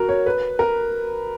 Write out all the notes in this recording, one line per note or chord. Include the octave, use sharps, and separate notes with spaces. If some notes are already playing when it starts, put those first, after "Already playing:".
Already playing: F#4 A#4
C#5
B4
A#4